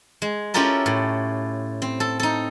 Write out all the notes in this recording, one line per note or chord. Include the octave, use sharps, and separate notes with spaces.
G#3
C#4 E4 F4 G4 A4 A#4
A2
C4
A4
D#4 A4